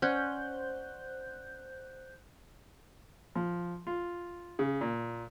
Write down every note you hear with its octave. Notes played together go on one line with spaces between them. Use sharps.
C#4 C5 D5 F#5 F#6 G6
F3
F4
C#3
A#2